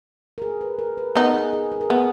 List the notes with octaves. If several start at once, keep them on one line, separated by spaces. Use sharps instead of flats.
A#4
G#4
B4
A#4
B4
B3 D#4 A#4
G#4
G#4
G#4
A#4
B3 G#4